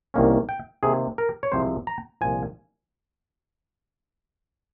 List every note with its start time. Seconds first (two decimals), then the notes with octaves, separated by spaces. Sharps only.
0.14 C2 C3 D#3 A#3 C#4
0.49 G5
0.83 C3 D#3 A#3 G#4
1.18 A#4
1.43 C#5
1.52 C2 C3 F3 G#3 C4 C5
1.87 A#5
2.21 C2 A#2 F3 G#5